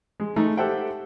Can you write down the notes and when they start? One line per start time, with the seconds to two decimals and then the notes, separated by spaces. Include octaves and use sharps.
0.20 G#3
0.36 G#3 A3 D#4
0.57 G4 A4 C5 E5 F#5 G5